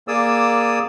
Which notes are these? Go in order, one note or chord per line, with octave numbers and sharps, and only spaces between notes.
A#3 G#4 D5 D#6 E6